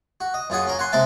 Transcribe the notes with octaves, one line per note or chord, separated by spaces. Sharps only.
F#4
D#5
F#2 F4 G#4 F#5
C#4 A#4
F#5 G#5 C6
C3 G#3 A#4 E5 A5